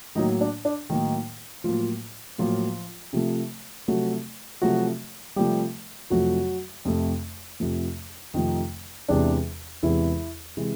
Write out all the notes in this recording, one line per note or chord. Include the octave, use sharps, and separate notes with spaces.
A2 D#3 F#3 A#3 D#4
D4
D4
A2 D#3 F#3 A#3 D#4
A2 F3 F#3 A#3 F4
A2 F3 F#3 A#3 F4
C3 F3 A3
C3 F3 F#3 A3 F#4
C3 F3 F#3 A3 F#4
C3 F3 G3 A3 G4
F2 C3 F3 F#3 A3 F#4
F2 C3 F3 A3
F2 C3 F3 A3
F2 C3 D#3 F3 A3 D#4
E2 C3 E3 G#3 D4
E2 C3 E3 G#3 E4
C3 E3 G#3